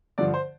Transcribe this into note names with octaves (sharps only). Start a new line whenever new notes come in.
G2 D3 F3 D5
C5